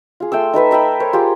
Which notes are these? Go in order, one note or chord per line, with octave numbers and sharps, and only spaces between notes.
F4 G#4
A3 G5 C6 E6
D#4 A4 B4 E5
D#5 E5 G5 B5
A#4 C5 C#5
F4 G4 G#4